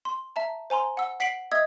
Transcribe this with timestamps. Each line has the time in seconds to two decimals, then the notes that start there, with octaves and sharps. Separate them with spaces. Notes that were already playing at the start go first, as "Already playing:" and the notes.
0.05 C6
0.36 E5 A5 A#5
0.70 C5 G#5 A#5 C6
0.97 F#5 E6
1.20 F#5 B6 C7 D7 F#7
1.52 D#5 E5 D#6 E6 G#6